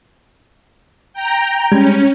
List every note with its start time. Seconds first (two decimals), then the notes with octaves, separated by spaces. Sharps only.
1.13 G5 A#5
1.72 G3 G#3 C#4 G#6